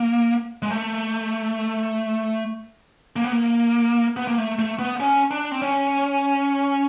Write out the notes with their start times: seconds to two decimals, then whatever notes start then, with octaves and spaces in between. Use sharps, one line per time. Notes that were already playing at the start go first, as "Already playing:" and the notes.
Already playing: A#3
0.62 G#3
0.71 A3
3.16 A#3
3.24 B3
3.32 A#3
4.17 B3
4.27 A#3
4.38 A3
4.59 A3
4.79 B3
5.00 C#4
5.31 D4
5.52 C4
5.62 C#4